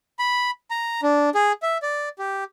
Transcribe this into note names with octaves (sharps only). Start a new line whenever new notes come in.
B5
A#5
D4
G#4
E5
D5
G4